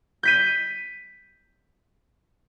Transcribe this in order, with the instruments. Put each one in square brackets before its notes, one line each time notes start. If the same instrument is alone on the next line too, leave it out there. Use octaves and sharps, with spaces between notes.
[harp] G6 B6 D#7